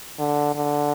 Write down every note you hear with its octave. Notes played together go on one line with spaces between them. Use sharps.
D3
D3